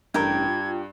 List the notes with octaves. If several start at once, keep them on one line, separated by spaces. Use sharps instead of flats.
A1 G2 G4 A#4 G5 G#6
F4